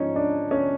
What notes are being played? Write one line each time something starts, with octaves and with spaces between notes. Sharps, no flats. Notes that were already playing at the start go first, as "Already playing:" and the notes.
Already playing: G#2 F3 C#4 D#4
D4
C#4